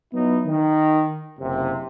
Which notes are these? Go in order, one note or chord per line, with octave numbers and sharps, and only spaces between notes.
F#3 B3 D#4 E4
D#3
F#1 C3